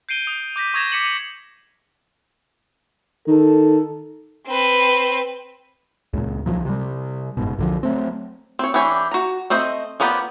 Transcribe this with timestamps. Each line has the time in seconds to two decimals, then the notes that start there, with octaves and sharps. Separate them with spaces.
0.09 G6 C7 D7 D#7 G7
0.27 D#6
0.56 D6 G6 A#6 B6
0.74 C#6 D#6 G#6 A#6 E7 F7
0.92 D6 B6 C#7 E7 F#7
3.27 D#3 A4
4.46 C4 B4
6.13 C#2 A#2
6.46 C2 F#2 F3 F#3
6.65 C3 G3
7.37 F#1 G#2 B2
7.59 B1 D3 F3
7.83 F#3 A3 C4
8.59 C4 C#5
8.74 E3 G3 D4 G4 C#5
9.11 F#4 A#5
9.50 A3 C4 C5 D#5
10.00 F3 A#3 B3 G4 D5